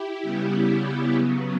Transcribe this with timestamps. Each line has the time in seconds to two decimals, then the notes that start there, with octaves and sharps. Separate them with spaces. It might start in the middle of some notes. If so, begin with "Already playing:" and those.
Already playing: E4 G4
0.23 C#3 G3 B3
1.13 C#3 F#3 B3